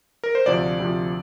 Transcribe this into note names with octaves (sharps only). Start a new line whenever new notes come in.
A#4
C5
D2 C3 F3 D5
D2 C3 F3